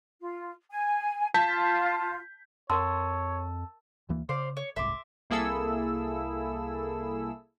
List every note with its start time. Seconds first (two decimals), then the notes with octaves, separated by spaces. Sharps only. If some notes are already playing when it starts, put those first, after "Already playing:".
0.20 F4
0.70 G#5
1.34 F4 A5 G6 B6
2.70 F2 A#4 C#5 F#5 A5 C6 E6
4.09 D2 E3 A#3
4.29 C#3 C5 D5 F5
4.57 C#5
4.76 F#1 C2 G#2 E5 C6 D6
5.30 C2 A#3 E4 G#4 A4 E6